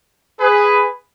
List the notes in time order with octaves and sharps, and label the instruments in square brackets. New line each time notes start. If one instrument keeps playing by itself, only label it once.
[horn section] G#4 B4